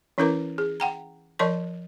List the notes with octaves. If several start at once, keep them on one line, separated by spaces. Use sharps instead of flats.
E3 C#4 E4 A#4 B4 A#5
G#4
F#5 G5 A#5
F3 A#4 D5 D#5 A5 C6